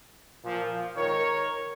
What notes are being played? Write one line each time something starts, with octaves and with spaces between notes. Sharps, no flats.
A#2 F3
G#2 D#3 A#4 C#5